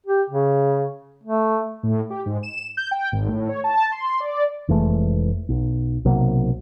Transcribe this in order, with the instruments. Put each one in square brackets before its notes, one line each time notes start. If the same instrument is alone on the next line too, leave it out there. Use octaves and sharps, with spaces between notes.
[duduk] G4
C#3
A3
[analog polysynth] A2
G4
G#2
E7
G6
G5
G#1
A2
C#5
A5
C6
D5
[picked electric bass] F1 E3 G#3 A3
B1
B1 C3 F#3 A#3